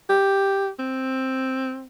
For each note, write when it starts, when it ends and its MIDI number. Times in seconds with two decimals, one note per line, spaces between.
0.09 0.69 67
0.79 1.86 60